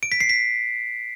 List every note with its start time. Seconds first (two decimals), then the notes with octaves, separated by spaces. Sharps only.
0.03 D7
0.12 B6
0.21 C7
0.29 B6